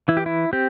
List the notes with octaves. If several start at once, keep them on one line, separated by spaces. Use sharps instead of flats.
E3 E4
G4
E4
C4 G4